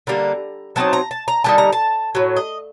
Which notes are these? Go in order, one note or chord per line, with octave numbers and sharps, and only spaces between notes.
D3 G3 A#3 A#5
F#3 C4 D#4 A5
A#5
A5
A#5
D3 G3 A#3 D#4 A5
A#5
A5
A2 F#3
D#5